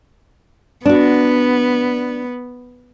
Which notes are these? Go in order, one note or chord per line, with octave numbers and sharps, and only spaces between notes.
B3 D4 F#4